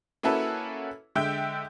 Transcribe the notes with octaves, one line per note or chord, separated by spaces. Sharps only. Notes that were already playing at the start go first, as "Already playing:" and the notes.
A#3 C#4 E4 F#4 A4 B4
D3 G#3 E5 G5 G6